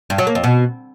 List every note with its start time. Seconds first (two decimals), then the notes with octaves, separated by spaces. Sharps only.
0.10 G2
0.18 F#3
0.27 A#3
0.35 F2
0.44 B2